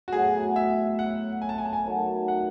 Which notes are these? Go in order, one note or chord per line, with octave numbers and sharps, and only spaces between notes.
F#4
A2 F#3 B3 G#4
E5
F#5
G#5
A5
G#5
A5
G#5
D#3 F#3 A3
F#5